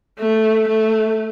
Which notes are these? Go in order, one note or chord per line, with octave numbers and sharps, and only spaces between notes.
A3
A3